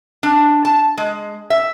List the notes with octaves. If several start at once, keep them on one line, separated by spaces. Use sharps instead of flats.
D4
A5
G#3
E5